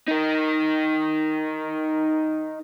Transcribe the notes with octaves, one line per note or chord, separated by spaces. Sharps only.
D#4 A#4